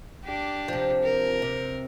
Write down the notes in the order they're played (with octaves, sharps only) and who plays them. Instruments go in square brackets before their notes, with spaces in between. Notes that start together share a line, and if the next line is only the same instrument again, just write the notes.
[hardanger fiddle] D4 G4
[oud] C3 F3
[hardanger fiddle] A#4
[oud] C3